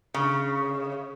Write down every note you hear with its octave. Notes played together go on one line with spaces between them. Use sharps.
C#3